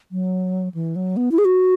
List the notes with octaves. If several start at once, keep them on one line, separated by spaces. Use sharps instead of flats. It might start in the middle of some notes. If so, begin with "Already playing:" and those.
F#3
E3
F#3
B3
E4
G#4
F#4